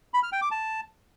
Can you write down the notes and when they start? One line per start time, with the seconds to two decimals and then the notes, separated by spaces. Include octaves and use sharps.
0.14 B5
0.23 F6
0.32 G5
0.42 D6
0.51 A5